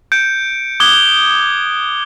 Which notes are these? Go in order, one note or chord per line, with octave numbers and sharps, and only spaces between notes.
G6 C#7 D7
D6 D#6 F#6 G#6 G7